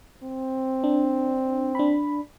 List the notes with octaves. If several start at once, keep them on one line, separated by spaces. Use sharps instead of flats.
C4
D4
D4 B5